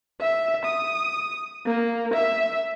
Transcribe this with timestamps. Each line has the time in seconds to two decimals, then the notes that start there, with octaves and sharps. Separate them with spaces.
0.21 E5
0.65 D#6
1.67 A#3
2.14 E5